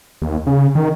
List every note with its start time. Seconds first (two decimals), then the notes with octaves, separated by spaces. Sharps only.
0.22 D#2
0.47 C#3
0.75 D#3